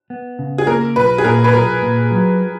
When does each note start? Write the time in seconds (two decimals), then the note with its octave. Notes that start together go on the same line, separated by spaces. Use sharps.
0.10 B3
0.39 C#3
0.58 G#4
0.67 A#3 A#4
0.96 B1 B4
1.18 G#4
1.24 A#2 A#4
1.44 B4
1.53 B1 A#4
1.82 A#2
2.11 F#3